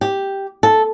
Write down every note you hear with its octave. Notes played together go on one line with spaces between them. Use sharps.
G4
A4